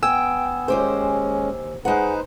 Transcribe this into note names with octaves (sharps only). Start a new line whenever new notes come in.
B3 G5 G#5 E6
D#2 G#3 C#4 G4 C5
G#3 D#4 B4 C5 F#5